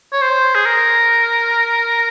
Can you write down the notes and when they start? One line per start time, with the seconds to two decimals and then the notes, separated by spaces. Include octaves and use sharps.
0.12 C#5
0.21 C5
0.55 G#4
0.66 A#4